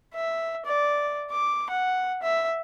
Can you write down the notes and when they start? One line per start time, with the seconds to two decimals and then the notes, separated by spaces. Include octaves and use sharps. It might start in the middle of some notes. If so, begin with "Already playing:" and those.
0.14 E5
0.66 D5
1.31 D6
1.70 F#5
2.23 E5